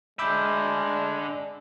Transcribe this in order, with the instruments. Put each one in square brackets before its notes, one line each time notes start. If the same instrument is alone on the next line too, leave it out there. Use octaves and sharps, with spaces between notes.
[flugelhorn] G#3 [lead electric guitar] D4 E5 [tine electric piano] B5 D6 G6